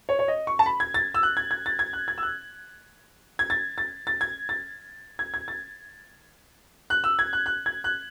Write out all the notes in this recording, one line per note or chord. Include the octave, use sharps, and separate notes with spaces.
C#5
C#5
D#5
C#6
A5
B5
G#6
A6
E6
F#6
G#6
G#6
A6
G#6
F#6
G#6
E6
F#6
G#6
A6
A6
A6
G#6
A6
G#6
G#6
A6
F#6
E6
G#6
F#6
F#6
G#6
F#6